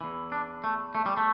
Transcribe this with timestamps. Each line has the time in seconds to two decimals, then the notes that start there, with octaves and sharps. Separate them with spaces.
0.01 E2 E3
0.32 D4
0.64 A3
0.95 A3
1.06 G3
1.17 A3